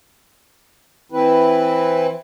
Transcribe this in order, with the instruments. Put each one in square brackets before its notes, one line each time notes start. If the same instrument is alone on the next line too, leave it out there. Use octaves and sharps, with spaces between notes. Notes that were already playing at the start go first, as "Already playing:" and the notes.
[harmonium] E3 C4 E4 B4